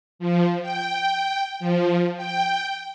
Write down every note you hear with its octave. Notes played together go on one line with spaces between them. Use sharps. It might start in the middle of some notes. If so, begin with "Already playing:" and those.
F3
G5
F3
G5